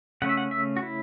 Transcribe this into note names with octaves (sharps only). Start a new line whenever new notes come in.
C#3 A3 C#4 F#5
E5
F#5
E5
F#4
E4